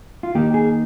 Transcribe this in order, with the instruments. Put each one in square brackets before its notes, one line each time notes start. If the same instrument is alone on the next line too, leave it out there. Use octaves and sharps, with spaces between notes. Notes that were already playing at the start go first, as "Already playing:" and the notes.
[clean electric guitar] F4
D#3 A#3 D#4 G4
G#4